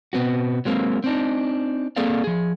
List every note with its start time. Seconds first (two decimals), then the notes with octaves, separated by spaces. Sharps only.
0.13 B2 B3 C4 F#4
0.65 F#3 G#3 A#3 C4
1.04 C4 D4 D#4
1.96 A#3 C4 G#4 A4 D5 F5
2.24 F3 G#4